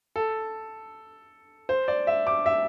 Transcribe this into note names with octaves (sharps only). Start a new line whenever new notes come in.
A4
C5
D5
E5
D6
E5